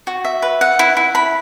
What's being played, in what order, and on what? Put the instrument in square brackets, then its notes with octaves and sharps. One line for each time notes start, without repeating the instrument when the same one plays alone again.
[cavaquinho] F#4
E5
B4
F#5
E4
E4
B5